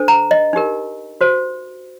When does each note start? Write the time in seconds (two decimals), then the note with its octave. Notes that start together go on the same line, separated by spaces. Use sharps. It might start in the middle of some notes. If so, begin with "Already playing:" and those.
Already playing: D4 A4 C5
0.08 A#5
0.31 D#5
0.53 D#4 G4 A#4
1.21 F#4 C5